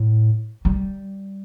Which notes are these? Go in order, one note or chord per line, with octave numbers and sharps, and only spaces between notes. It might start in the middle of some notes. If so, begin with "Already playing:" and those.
Already playing: A2
G3